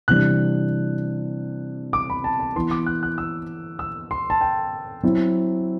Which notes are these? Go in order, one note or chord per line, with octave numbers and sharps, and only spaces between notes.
C3 E3 G3 D4 F#6
D6
B5
A5
A5
E3 B3 E4 C6
D6
F#6
F#6
E6
E6
C6
A5
G5
F#3 C4 E4